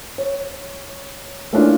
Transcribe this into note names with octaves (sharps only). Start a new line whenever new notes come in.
C#5
A3 A#3 C#4 D4 E4 F4